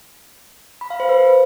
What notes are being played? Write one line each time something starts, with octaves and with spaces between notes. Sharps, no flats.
B5
F5
C5
B4